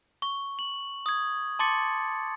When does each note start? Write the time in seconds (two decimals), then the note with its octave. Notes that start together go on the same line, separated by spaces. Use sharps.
0.22 C#6
0.59 F#7
1.06 D#6 G#6
1.59 A5 C6 D6 A6 C#7